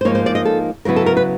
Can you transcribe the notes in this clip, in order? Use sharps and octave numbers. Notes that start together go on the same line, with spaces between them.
C5
G#2 F3 A#3 D#4 C#5
C5
D5
D#5
A4
C#3 F#3 B3 E4 A#4
A4
A#4
B4